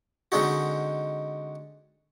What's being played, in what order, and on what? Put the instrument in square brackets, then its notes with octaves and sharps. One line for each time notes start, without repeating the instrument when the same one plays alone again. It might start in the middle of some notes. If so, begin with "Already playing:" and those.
[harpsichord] D3 G#3 C4 D#4 F#4